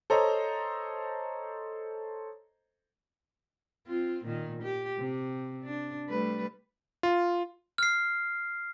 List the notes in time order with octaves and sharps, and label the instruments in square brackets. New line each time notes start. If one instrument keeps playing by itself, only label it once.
[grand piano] A4 C5 C#5 D#5 A#5
[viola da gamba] C4 F4
A#2 D#3
G4
C3
D4
G3 A3 B4
[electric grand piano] F4
[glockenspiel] F6 C7